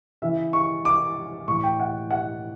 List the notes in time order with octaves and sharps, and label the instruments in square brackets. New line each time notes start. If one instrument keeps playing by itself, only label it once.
[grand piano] C#3 E3 E5
C#6
D6
A2 E3 C#6
G5
F#5
F#5